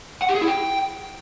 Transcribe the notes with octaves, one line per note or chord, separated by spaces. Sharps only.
F#5
G4
G#4
E4
G5